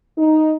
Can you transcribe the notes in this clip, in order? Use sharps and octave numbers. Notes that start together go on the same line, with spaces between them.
D#4